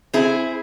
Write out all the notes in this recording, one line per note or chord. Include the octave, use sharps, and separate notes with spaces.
C4 E4 G#4